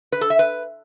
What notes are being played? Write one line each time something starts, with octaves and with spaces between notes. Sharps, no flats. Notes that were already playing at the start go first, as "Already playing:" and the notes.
B4
A4
E5
B4